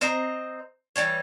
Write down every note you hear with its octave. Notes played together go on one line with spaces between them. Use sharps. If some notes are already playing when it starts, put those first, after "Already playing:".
C4 C5 D#5 A#5
E3 F#3 G3 C#5